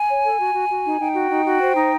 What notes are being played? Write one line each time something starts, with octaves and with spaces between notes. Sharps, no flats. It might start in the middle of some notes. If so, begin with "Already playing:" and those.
Already playing: G#5
C#5
A4
F#4
F#4
F#4
D#4
D#4 G5
F#4
D#4
F#4
C5
D#4